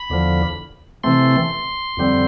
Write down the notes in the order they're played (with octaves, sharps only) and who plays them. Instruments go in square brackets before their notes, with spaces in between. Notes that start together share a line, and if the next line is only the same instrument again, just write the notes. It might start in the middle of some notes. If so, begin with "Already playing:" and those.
Already playing: [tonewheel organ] B5
E2 D3 F3
C3 E3 A3 C4 C6
F2 D3 G3 C4